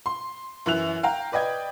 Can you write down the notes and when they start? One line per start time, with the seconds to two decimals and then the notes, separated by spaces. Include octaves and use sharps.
0.06 C6
0.66 F#2 E3 E4 F#6 F7
1.03 F5 G5 A#5
1.32 B4 D5 D#5 G5 G#6